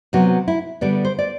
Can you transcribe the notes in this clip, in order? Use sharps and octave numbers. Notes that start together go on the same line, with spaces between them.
C3 F#3 B3 F#4
E4
D3 G3 B3 D5
C5
D5